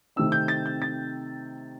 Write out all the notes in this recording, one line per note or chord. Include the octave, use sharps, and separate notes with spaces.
C3 D#3 A3 C4 E6
G6
A6
G6
A6